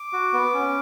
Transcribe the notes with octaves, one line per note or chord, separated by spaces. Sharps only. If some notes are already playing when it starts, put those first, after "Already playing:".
Already playing: D6
F#4
B3
C#4